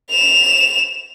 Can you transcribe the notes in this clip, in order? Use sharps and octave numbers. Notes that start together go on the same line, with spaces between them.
E7 F7